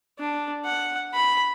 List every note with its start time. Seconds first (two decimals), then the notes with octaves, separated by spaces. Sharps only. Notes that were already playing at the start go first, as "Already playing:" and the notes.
0.19 D4
0.65 F#5
1.14 B5